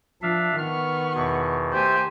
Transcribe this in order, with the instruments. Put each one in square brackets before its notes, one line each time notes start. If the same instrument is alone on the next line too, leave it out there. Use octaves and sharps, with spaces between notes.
[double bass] F3 [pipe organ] D4 E5 F5
[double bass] D#3 [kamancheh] B3 C#6 [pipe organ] F6
[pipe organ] E2 B2
[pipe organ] A3 [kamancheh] G4 G#5 [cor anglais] C5